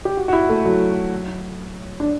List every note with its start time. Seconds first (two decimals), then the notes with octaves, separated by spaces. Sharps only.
0.05 G4
0.17 F#4
0.28 F#4
0.33 E4
0.49 A3
0.65 F#3
2.00 D4